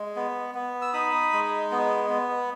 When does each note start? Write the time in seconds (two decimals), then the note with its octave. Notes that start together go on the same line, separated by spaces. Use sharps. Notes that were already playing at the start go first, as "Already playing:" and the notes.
Already playing: G#3
0.16 B3
0.55 B3
0.82 E6
0.93 D#4 B5 D#6
1.33 G#3
1.71 B3
2.10 B3